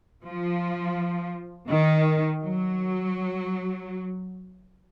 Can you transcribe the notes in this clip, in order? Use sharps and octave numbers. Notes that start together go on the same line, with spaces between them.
F3
D#3
F#3